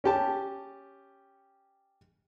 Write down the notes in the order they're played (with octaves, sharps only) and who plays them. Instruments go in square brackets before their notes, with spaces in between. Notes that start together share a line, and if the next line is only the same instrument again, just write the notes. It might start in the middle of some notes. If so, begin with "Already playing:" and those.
[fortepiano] C#4 G4 A5